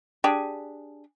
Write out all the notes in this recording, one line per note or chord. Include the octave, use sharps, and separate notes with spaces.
D4 G4 G#4